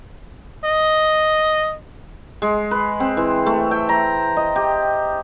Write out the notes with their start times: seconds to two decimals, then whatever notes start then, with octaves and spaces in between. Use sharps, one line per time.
0.65 D#5
2.42 G#3
2.71 B4
3.00 C4
3.17 E3
3.46 A3
3.71 G5
3.89 A#5
4.37 D#5
4.56 G4